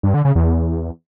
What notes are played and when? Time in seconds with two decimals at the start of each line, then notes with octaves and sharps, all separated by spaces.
0.03 G2
0.14 D3
0.25 C#3
0.35 E2